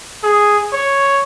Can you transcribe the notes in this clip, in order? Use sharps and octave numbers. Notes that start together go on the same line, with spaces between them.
G#4
C#5